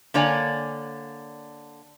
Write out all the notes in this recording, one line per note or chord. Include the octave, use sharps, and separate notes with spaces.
D3 A#3 C#5 D5 G#5